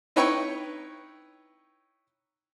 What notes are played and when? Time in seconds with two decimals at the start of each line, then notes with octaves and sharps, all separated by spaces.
0.16 D#4 E4 B4 C#5 G5 C#6